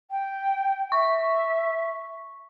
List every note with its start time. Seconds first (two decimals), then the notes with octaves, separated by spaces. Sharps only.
0.10 G5
0.92 E5 C#6